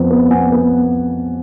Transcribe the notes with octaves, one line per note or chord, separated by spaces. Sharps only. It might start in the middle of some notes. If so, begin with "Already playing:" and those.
Already playing: F2 B3
B3
B3 F#5 G#5
B3